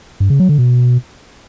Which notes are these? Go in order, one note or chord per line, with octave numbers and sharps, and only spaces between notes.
G2
C#3
F#3
D3
B2